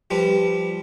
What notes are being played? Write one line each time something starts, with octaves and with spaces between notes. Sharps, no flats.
F3 G3 B4